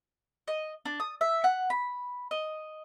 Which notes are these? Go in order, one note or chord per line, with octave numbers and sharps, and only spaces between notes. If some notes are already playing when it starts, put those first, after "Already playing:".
D#5
D4
D#6
E5
F#5
B5
D#5